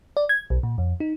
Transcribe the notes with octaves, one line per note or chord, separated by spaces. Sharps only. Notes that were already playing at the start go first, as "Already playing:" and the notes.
D5
G#6
B1
A#2
F2
D#4